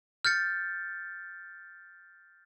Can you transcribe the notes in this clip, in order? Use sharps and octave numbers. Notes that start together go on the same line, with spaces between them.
F6 G6 A6 C#7